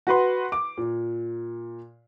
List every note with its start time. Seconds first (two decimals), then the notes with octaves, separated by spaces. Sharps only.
0.07 F#4 B4 C6
0.52 D6
0.78 A#2